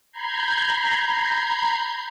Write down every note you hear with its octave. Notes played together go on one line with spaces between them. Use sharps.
A#5 B5 G6 G#6 C7